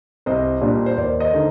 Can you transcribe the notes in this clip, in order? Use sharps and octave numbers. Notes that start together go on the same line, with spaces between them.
C2 C5 D#5
A#2 G3 D4 F4
C5
D#2 D5
C5 D#5
D3 A3 D#4